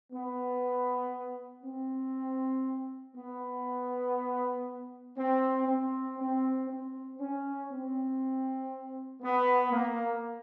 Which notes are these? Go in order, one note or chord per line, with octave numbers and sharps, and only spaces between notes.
B3
C4
B3
C4
C4
C4
C4
C#4
C4
B3
A#3